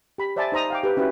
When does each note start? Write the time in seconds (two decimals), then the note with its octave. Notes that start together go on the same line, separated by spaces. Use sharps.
0.18 G4 B5
0.36 C5 D5 E5 G#5 A5 B5
0.52 D#4 C5 A#5 D#6
0.70 F5 G5 D6
0.83 G4 B4
0.97 C#4 E4 F#4 B4